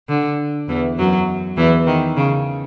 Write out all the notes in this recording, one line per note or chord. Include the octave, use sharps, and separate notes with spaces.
D3
E2 E3
F#2 F#3
E2 E3
D#3
C#3